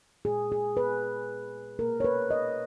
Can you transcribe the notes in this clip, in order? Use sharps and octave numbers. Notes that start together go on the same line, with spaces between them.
A#2 G#3 G#4
G#4
B4
B2 A#3 A#4
C#5
B4
D#5